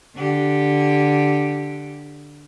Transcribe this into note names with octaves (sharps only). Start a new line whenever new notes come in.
D3 G4